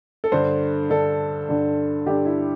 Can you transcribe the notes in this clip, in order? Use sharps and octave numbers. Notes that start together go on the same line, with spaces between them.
A4
G2 D3 C5
G2 D3 A4
G2 D3
G2 D3 G4
E4